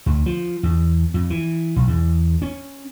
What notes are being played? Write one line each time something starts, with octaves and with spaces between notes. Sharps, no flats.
D2
F3
E2
F2
E3
B1
E2
C#4